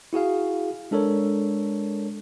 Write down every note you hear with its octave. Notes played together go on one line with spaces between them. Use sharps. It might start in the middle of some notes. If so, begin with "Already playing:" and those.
E4 F#4 G#4 F5
G#3 D4 A4 A#4 C#5